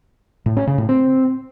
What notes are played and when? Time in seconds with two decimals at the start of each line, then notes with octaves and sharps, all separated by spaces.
0.46 A2
0.57 C#4
0.67 C#3
0.78 A2
0.89 C4